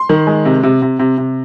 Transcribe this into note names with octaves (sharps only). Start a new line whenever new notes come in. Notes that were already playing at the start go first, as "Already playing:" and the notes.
Already playing: C6
D#3
G#3
C3
C3
C3
C3
C3